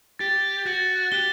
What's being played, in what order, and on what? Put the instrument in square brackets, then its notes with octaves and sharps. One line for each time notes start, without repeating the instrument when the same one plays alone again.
[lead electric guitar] G4 [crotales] A6
[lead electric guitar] F#4 [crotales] A6
[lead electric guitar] G4 [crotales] G7